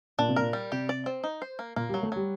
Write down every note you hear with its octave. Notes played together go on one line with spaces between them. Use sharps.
A#2 D4
C3
A#2 A#4
G3
C3 G4
D5
C4
D#4
C5
A#3
A#2 A#3
G3
F#3
A3
F#3 G3